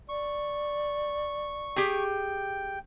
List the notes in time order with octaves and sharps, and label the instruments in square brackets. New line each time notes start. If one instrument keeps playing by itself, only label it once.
[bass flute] D5 [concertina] C#6
[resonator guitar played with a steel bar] G4 G#4 [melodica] G5